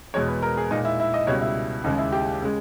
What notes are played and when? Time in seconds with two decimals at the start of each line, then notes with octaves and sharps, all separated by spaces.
0.14 E2 B2 G#3 C#5
0.28 B4
0.42 A#4
0.57 G#4
0.71 A#2 G#3 D#4
0.85 E4
1.00 E4
1.14 D#5
1.27 C#2 B2 G3 C#5
1.41 E4
1.84 D#2 C#3 G#3 D#4
1.98 E4
2.12 G4
2.42 C#3 G#3